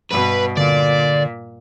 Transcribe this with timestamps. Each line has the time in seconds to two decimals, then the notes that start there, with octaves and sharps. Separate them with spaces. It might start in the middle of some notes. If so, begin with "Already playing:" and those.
0.11 G2 B2 B4
0.57 A#2 D3 D5